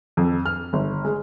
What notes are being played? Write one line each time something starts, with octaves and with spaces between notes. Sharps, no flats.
F2
F6
G1
G#3